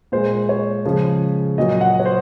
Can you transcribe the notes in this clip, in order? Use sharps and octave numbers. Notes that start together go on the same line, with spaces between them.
A#2 G#3 C5
C#5
C#3 F3 G#3
A#2 F#3 D#5
F#5
C#5
C5